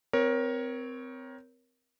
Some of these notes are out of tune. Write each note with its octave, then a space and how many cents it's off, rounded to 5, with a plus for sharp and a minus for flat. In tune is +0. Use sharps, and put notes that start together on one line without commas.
C4 -20 A#4 +20 C#5 +0